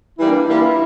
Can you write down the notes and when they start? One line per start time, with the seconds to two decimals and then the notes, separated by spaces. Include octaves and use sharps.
0.19 E3 G3 A#3 E4
0.29 D4
0.47 E3 G3 A#3 E4 F4 A#4